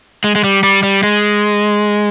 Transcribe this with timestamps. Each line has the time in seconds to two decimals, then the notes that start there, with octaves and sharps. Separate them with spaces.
0.24 G#3
0.35 G#3
0.44 G3
0.63 G3
0.83 G3
1.03 G#3